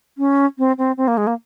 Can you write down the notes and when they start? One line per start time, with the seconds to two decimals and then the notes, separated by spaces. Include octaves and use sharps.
0.18 C#4
0.58 C4
0.78 C4
0.97 C4
1.08 A#3
1.17 G#3
1.27 A#3